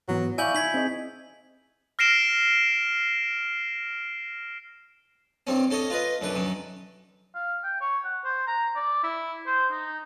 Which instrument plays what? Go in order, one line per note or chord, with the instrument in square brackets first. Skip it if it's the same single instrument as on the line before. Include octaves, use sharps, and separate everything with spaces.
[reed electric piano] G#2 E3 B3 [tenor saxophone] F#3
[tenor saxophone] E4 [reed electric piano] D5 F5 C#6 [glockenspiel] G#5 G6 F#7
[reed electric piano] D#4 [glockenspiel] G#6 B6 F#7
[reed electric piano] C4 G#4 D#5
[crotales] F6 A#6 C7 D7 E7 G7
[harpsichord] G2 C4 C#4
C#4 A4 C#5 D#5
F4 B4 D#5
F#2 D3 B4
F#2 D#3
[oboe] F5
G5
C#5
F#5
C5
A#5
D5
E4
C5
D#4